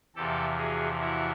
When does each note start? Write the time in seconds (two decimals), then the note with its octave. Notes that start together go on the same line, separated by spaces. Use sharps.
0.16 E2 C3 F3 G4 A4
0.58 F#4 G#4
1.00 E4 F#4